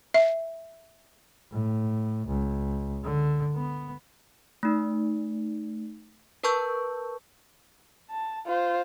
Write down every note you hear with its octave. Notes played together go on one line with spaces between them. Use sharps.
E5
A2
C#2
D3
B3
A3 D#4
A#4 B4 A5 C#6 E6 G6
A5
F4 C5